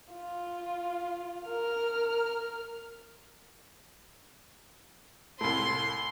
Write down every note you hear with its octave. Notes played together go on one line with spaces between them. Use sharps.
F4
A#4 F6
C2 A2 C6